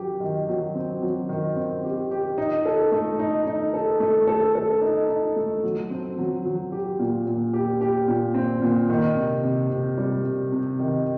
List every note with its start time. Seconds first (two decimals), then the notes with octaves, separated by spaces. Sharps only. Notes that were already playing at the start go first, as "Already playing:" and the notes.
Already playing: F#3 G4
0.20 D#3
0.48 F#3
0.75 C4
1.02 F#3
1.29 D#3
1.56 C4
1.84 G4
2.11 G4
2.38 D#4
2.66 A4
2.92 A3
3.19 D#4
3.47 D#4
3.74 A4
4.00 A3
4.27 A4
4.55 A4
4.82 D#4
5.09 D#4
5.36 A3
5.63 F#3
5.90 C4
6.18 F#3
6.45 F#3
6.72 G4
6.99 A#2
7.27 A#2
7.53 G4
7.81 G4
8.08 A#2
8.34 C4
8.62 A#2
8.90 D#3
9.16 C3
9.43 C3
9.70 C3
9.98 G3
10.25 C3
10.52 C3
10.79 D#3